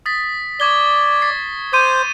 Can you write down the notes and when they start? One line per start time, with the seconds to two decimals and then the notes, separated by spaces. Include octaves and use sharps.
0.06 D#6 A6 B6
0.60 D5 C#6 G#6 G7
1.22 A6 B6 C7
1.73 C5 D6 G6 D#7